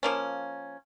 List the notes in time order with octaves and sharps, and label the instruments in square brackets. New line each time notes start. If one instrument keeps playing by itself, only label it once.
[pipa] F3 A#3 C#4